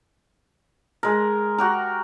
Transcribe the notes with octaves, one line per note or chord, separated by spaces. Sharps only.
G#3 A#4
F#4 G4 A#4